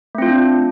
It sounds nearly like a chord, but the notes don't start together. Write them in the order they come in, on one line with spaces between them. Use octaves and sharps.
A3 C4 F4 D4